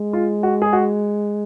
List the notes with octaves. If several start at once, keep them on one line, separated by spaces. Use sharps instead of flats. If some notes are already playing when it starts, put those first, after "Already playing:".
Already playing: G#3
F4
F#4
G#4
F#4